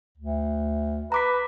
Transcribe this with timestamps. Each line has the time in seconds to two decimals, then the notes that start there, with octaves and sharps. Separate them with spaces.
0.18 D2
1.12 B4 A#5 D6 B6